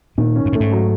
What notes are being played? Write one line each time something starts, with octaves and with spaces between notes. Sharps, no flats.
A#2 D#3
C#4
G#2
A2 A3
G#2
F#3